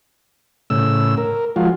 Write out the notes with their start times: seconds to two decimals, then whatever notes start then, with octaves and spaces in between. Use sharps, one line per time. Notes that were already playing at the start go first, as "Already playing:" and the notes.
0.70 A2 C#3 E6
1.17 A#4
1.56 F3 G#3 F4 F#4